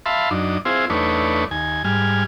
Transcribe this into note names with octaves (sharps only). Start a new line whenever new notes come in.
E5 F5 A5 B5 C6
F#2 D4 D#4
C4 E4 F4 G#4 C5
E2 A3 D4 D#4 B4 C#5
D#2 G#5
G#2 G3 G#5 F6